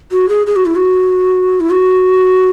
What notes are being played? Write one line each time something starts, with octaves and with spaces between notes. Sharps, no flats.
F#4
G#4
G#4
F#4
E4
F#4
E4
F#4